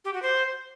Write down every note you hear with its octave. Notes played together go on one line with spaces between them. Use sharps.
G4
F#4
C5